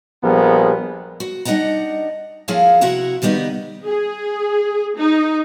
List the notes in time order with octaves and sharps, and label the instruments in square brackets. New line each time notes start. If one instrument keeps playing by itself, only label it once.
[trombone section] A#1 F3 G3 B3 G#4 A#4
[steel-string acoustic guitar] F#4
G3 D4 D#4 D#5 F#5 A#5
F3 A#3 E4 G#4 C#5 F5
C3 E4 F#4 F#5 A#5
D3 D#3 G3 B3 D#4
[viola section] G#4
D#4